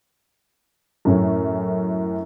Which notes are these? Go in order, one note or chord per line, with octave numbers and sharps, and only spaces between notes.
F#2 A2 C#4